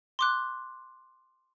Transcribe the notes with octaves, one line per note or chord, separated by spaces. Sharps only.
C6 D6 F#6